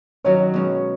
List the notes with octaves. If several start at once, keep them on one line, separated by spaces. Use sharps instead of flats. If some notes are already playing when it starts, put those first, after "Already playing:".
D#3 F#3 C#4 F#4 C#5
B2 G#3 C#4